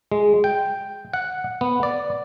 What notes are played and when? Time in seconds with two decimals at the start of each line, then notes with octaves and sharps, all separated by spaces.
0.12 G#3
0.44 G5
1.13 F#5
1.61 B3
1.83 D5